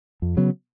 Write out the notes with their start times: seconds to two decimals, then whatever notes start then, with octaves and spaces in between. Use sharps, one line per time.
0.22 F2
0.37 C#3 F#3 B3